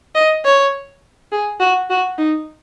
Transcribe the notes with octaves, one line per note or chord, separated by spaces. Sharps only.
D#5
C#5
G#4
F#4
F#4
D#4